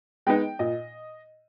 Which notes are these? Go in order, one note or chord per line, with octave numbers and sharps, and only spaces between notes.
G#3 B3 D#4 G5
A#2 D#5